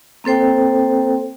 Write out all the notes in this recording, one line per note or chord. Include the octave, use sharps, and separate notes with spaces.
A#3 C4 A4 C5 G5